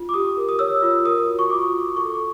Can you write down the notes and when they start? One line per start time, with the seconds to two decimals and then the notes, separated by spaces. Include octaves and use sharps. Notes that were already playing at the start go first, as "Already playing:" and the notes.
Already playing: F4
0.09 D6
0.14 G4 D#6
0.37 A#4
0.49 D#6
0.59 C#5 E6
0.82 F4
1.05 A#4 D#6
1.28 F#4
1.39 C#6
1.50 F4 D6
1.73 F4
1.97 A4 C#6
2.12 D6